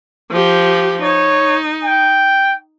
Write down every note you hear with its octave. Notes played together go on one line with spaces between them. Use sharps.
F3 G4
D#4 C#5
G5